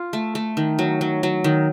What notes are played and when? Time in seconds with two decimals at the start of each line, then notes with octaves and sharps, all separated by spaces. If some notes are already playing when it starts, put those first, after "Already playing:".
Already playing: F4
0.13 A3
0.35 A3
0.57 D#3
0.79 F#3
1.01 F#3
1.23 F#3
1.44 D#3